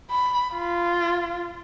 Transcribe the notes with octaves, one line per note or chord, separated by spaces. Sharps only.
B5
F4